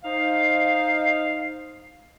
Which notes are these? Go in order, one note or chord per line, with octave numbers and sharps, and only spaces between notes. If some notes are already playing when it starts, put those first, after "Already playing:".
D#4 C5 F5